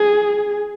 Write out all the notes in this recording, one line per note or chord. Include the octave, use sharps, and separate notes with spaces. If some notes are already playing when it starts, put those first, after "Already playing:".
Already playing: G#4